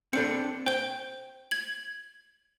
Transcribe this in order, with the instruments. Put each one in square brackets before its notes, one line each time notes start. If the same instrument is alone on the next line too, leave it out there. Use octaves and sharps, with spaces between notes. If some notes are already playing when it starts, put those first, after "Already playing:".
[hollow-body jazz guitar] C4 D4 A4 [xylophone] C#7
[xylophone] C5 G6 [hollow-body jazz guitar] G5
[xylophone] G#6 F#7